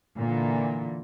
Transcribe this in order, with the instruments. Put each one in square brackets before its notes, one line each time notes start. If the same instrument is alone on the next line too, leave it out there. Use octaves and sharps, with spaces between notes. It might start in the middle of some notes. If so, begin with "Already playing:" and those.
[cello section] A#2 D3 E3